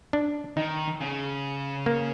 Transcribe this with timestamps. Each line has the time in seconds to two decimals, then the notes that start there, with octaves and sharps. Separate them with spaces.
0.13 D4
0.57 D#3 D#4
1.01 C#3
1.86 A#3